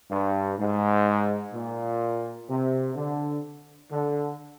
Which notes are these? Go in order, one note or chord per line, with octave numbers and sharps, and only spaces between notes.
G2
G#2
A#2
C3
D3
D3